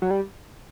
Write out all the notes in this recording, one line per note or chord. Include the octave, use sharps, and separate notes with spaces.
F#3
G3